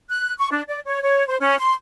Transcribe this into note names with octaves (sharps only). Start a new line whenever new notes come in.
F#6
C#6
D4
D5
C#5
C#5
C5
C#4
C6